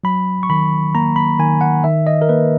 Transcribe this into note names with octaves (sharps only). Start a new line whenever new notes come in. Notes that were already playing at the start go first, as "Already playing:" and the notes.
F#3 B5
C#6
D#3 B5
A#3 A#5
B5
D#3 G#5
F#5
D#3 E5
D#5
A#4
A#3 B4